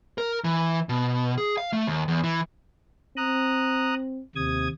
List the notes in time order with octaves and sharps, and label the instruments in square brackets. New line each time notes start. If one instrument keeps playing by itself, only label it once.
[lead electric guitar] A#4
E3
B2
G#4
F5
A3
D#2
E2
E3
[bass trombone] C4 [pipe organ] A#5 D#6 F#6
[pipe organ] D#2 D#6 G#6 [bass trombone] C3